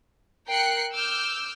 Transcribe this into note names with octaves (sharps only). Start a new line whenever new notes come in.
A#4 G5 F#6 C7 C#7
D6 E6 F6 G6